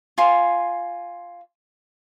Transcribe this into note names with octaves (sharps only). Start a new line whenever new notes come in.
F4 G#5 C6